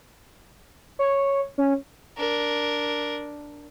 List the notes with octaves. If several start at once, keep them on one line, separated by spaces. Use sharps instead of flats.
C#5
C#4
D4 A#4